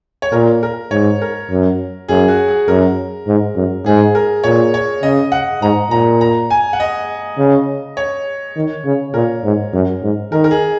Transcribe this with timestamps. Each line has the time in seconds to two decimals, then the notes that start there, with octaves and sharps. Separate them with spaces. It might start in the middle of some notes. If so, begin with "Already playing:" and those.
0.22 C#5
0.32 A#2 A#4
0.63 A#4
0.91 G#2 C#5
1.22 A#4
1.50 F#2
2.08 F#2 G#4
2.28 F#4
2.48 G#4
2.68 F#2 A#4
3.27 G#2
3.56 F#2
3.85 G#2 G#4
4.15 A#4
4.44 A#2 C#5
4.74 C#5
5.03 C#3 D#5
5.32 F#5
5.62 G#2 A#5
5.91 A#2 A#5
6.21 A#5
6.50 G#5
6.73 F#5
6.80 D#5
7.38 C#3
7.97 C#5
8.56 D#3
8.85 C#3
9.14 A#2 A#4
9.44 G#2
9.73 F#2
10.02 G#2
10.32 D#3 A#4
10.44 A#4
10.51 G#4